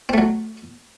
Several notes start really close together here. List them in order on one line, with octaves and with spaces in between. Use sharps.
C4 A3 F#3